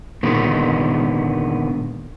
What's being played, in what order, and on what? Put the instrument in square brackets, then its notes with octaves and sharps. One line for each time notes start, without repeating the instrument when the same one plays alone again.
[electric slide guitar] A#2 D3 D#3 G#3 A#3 B3